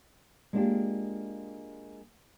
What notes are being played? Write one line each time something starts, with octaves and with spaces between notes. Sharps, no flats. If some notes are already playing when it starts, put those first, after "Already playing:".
G#3 A#3 B3 D4 F4 G4